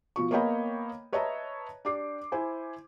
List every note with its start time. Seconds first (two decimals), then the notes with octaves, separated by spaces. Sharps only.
0.16 B2 F3 C#6
0.31 A#3 B3 C#5 D#5 G5 B5
1.12 B4 C#5 D#5 E5 A5 A#5
1.85 D4 G4 D6 C7
2.32 E4 C5 G#5